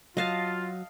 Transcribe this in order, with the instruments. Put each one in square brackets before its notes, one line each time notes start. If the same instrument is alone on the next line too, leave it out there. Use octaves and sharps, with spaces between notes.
[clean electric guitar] F#3 [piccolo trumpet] F4 [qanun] D#5 F5 A5